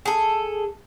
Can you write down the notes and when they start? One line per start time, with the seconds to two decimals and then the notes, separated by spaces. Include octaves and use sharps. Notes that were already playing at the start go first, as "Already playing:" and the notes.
0.06 G#4 A4